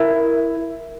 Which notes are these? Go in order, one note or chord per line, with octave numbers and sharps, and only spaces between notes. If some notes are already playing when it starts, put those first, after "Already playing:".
Already playing: E4 A#4